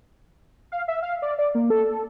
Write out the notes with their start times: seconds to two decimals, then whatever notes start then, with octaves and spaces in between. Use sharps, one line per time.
0.72 F5
0.88 E5
1.03 F5
1.22 D5
1.39 D5
1.55 A#3
1.70 A4